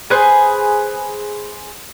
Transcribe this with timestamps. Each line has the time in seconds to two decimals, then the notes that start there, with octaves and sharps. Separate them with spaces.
0.10 G#4 B4 C5